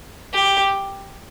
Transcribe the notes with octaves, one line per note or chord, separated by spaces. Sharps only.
G4